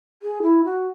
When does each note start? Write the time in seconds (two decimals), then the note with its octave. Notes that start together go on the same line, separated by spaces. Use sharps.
0.22 G#4
0.43 E4
0.65 F#4